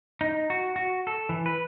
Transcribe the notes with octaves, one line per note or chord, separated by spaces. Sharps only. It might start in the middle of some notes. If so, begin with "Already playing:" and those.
D#4
F#4
F#4
A4
E3
B4